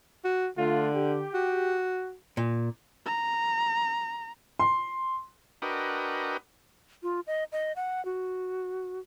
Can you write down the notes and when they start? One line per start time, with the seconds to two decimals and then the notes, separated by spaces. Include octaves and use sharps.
0.25 F#4
0.58 D3 A3 D4 F4
0.95 G4
1.34 F#4
2.37 A#2
3.06 A#5
4.60 C6
5.62 D4 F#4 A#4 B4 D#5 G5
7.03 F4
7.27 D#5
7.52 D#5
7.76 F#5
8.05 F#4